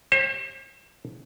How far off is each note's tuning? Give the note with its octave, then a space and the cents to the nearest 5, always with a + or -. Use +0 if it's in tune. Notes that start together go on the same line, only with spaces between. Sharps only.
G4 +0 C5 +40